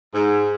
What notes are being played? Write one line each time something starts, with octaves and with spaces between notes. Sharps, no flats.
G#2